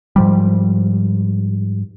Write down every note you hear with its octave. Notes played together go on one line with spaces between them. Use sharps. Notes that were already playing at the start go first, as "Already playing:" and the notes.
G#2 F3 G3